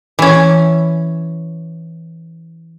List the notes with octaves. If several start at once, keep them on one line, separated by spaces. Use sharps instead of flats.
E3 C#4